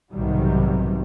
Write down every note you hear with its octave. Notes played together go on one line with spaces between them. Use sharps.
B1 G#2 C3 D#3 F#3 G3